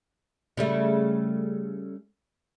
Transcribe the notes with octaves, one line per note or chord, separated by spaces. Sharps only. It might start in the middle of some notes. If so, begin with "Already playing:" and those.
C#3 G3 A3